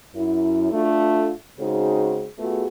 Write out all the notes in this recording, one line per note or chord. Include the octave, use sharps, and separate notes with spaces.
F#2 E4
A3 D4 F4
C#3 G#3 C4 D#4 F#4 G#4
A3 B3 F4 F#4 G#4